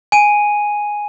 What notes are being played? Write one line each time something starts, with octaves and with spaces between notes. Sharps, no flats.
G#5 D#7